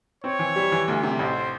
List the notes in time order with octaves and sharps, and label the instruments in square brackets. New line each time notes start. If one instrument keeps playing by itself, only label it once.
[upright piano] C4 [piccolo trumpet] C#5
[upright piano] E3
G3
E3
D2
C3
[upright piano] A1 [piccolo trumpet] C5